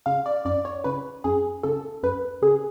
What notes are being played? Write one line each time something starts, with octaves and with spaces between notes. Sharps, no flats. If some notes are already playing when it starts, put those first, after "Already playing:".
C#3 F5
D5
F#2 D5
C#5
C#3 B4
F#2 G#4
C#3 A4
F#2 B4
C#3 G#4